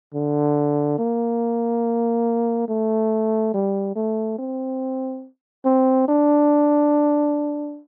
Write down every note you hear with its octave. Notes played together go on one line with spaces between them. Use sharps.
D3
A#3
A3
G3
A3
C4
C4
D4